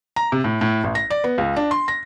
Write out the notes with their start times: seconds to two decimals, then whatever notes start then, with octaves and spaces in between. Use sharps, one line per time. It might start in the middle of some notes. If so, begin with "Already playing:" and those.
0.16 A#5
0.32 C3
0.44 A2
0.61 A2
0.84 A1
0.95 A#6
1.10 D5
1.24 B3
1.38 C#2
1.56 D4
1.71 C6
1.88 A#6